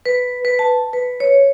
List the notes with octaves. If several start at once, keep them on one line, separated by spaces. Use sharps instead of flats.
B4
B4
A5
B4
C#5